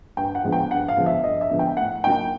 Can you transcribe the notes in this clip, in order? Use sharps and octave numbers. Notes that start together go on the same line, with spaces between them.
G2 G5
F#5
D3 F3 G#3 B3
G5
G2 F#5
F5
D3 F3 G#3 B3
E5
G2 D#5
E5
D3 F3 G#3 B3
G5
A2 F#5
F#3 A#3 D#4 G5